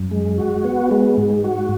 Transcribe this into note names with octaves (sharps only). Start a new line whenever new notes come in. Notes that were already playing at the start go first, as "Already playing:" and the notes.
Already playing: F#2
G#3
F#4
B3
G#3
G#2
F#4